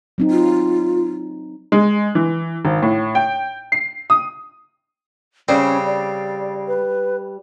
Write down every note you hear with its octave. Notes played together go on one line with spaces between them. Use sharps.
F#3 C4 D#4
F4
G#3
E3
G#1
A2
G5
C7
D#6
C#3 G3 C4 C#4
D5
B4